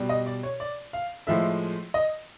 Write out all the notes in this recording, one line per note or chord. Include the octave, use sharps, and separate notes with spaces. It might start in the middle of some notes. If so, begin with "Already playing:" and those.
Already playing: B2 G3
D#5
D5
C#5
D5
F5
A2 F3 G#3 E5
D#5